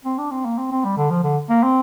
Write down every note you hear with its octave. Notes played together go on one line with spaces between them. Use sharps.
C4
D4
C4
A#3
C4
C4
G3
D3
F3
D3
A#3
C4